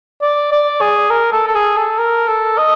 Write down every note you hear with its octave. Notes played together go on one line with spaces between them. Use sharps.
D5
D5
G#4
A#4
A4
A4
G#4
A4
A#4
A4
D#5